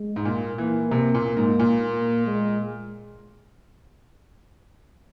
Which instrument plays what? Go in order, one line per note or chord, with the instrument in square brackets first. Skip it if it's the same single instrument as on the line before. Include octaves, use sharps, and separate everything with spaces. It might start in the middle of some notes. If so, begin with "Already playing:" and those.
Already playing: [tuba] G#3
[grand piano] G#2
[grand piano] A#2 [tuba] A#3
[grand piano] E3 [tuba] A#3
[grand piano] C3
A#2
G#2
A#2
[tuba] G#3